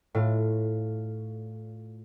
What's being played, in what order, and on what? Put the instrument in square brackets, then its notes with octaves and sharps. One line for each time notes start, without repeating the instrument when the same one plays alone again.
[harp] A2 F4